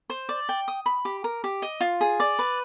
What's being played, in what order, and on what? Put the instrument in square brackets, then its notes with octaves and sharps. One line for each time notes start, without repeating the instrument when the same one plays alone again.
[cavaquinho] C5
D5
G5
D#6
B5
G4
A#4
G4
D#5
F4
G#4
D5
B4